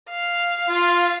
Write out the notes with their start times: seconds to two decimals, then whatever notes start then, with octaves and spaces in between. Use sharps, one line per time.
0.10 F5
0.68 F4